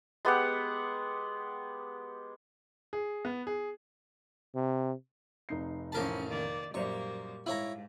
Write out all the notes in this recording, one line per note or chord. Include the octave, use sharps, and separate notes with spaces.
G#3 B3 G4 F#5
G#4
B3
G#4
C3
F1 D#4 C7
A1 F3 C#4 A#4 A5
D#3 A#3 D5
F#2 A#2 G3 A#3 C5 D5 C#6
G#2 E4 C#5 F5 A#5